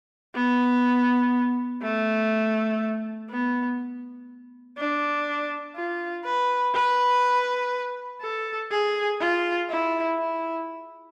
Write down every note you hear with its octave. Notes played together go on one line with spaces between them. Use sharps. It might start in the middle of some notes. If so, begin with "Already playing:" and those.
B3
A3
B3
D4
F4
B4
B4
A4
G#4
F4
E4
E4